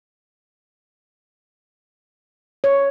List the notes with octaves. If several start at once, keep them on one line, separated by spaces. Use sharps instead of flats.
C#5